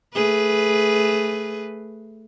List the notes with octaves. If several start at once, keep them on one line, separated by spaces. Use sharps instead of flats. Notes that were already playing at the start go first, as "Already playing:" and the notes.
A3 G#4 B4